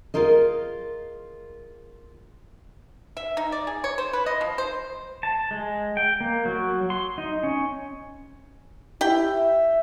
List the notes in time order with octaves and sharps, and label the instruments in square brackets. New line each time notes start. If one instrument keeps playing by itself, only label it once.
[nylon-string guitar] F4 G#4 A#4 C5 D#5
[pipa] E5
D#4
D5
G#4
C#5
C5
B4
D#5
F3
C5
[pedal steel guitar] A5
G#3
G5
A#3
F#3
C6
D#4
C#4
[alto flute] E4 [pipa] G4 G5
[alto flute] E5